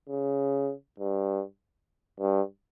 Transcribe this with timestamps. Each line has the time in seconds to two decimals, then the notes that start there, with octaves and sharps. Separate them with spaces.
0.09 C#3
1.00 G2
2.20 G2